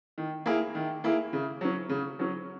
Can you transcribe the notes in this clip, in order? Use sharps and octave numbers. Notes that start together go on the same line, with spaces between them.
D#3
A#3 E4 G#4
D#3
A#3 E4 G#4
C#3
F#3 C#4
C#3
F#3 C#4